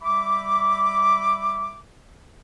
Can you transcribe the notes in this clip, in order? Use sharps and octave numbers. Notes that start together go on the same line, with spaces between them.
G3 E5 B5 D6